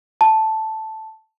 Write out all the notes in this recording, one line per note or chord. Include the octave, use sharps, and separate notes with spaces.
A5